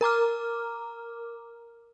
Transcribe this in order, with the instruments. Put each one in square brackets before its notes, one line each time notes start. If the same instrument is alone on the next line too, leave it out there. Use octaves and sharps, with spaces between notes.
[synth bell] A#4 A#5 D6 F6